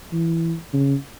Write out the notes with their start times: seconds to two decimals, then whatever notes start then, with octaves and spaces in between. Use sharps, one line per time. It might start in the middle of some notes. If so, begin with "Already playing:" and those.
0.12 E3
0.73 C#3